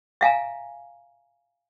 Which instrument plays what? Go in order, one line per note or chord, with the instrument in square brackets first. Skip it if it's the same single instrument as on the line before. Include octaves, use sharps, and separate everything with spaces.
[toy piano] E5 F5 G#5 A#5